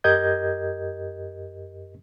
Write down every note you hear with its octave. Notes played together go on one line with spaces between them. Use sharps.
F#2 G4 A#4 D#5 G6 G#6